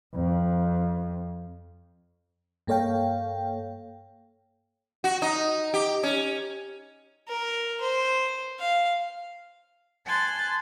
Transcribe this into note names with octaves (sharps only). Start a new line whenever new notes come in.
F2
G2 A#3 A4 C#5 F5 G5
F#4
D#4
G4
C#4
A#4
C5
F5
G#5 A5 C6 F#6 A6